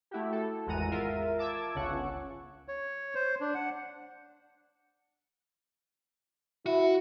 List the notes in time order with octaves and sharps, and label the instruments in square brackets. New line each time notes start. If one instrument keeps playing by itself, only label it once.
[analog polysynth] A3 E4 F#4 G4
A4
G#1 E2 G#3 F#5 A#5 D#7
F4 A#4 E5
A5 D6 E6 G#6
G1 C#2 C#3 C#4 F#5 C#6
[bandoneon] C#5
C5
D4
F#5
[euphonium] E4 [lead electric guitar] F#4